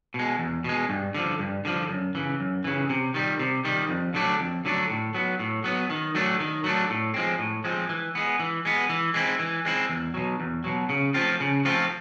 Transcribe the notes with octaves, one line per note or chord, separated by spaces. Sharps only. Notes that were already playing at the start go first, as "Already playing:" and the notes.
B2 G#3
E2
B2 G#3
G2
D3 F3
G2
D3 F3
F#2
C#3 E3
F#2
C#3 E3
C3
D#3 G3
C3
D#3 G3
F2
D3 F#3 A3 D4
F2
D3 F#3 A3 D4
A2
F#3 B3
A2
F#3 B3
D#3
F#3 A3 D4
D#3
F#3 A3 D4
A2
F3 G#3 C4
A2
F3 G#3 C4
E3
G#3 B3
E3
G#3 B3
E3
G#3 C4 E4
E3
G#3 C4 E4
E2
B2 F#3
E2
B2 F#3
C#3
F3 A3 C4 F4
C#3
F3 A3 C4 F4